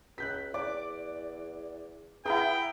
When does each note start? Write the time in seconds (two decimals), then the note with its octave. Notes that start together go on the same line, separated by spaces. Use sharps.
0.18 C#2 F#6 G6 B6
0.54 E2 D5 D6
2.25 E4 G#4 B4 F#5 G5 A#5 D#6